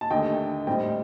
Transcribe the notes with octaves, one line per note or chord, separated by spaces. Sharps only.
A5
D#2 D3 A3 D#5 G5
A2 G3 C4 D#5 G5